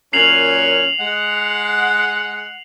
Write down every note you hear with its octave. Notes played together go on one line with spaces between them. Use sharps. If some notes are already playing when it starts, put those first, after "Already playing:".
F#2 A#2 C#4 C7 F7 F#7
G#3 F#5